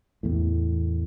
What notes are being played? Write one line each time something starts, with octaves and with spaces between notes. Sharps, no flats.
E2 A2